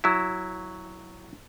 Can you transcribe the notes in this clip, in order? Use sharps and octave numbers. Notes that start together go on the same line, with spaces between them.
F#3 E4